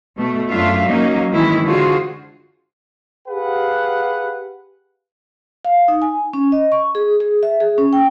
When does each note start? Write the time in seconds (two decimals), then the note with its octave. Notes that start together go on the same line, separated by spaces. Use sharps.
0.16 B2 A3
0.51 F#2 A3 D4 F4 E5 F5
0.87 F#3 A#3 C#4 D#4
1.32 D#3 E3 G#3 C#4 E4
1.67 D3 F4 F#4 G#4 C5
3.28 G4 G#4 B4 F5 F#5
5.65 F5
5.88 D#4
6.02 G#5
6.33 C#4
6.52 D#5
6.72 C#6
6.95 G#4
7.20 G#4
7.43 E5
7.60 G#4
7.78 C#4
7.93 G5